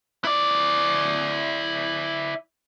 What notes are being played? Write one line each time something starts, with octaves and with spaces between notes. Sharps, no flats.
E4 D5